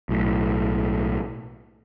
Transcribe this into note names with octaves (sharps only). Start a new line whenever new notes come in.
B1 A2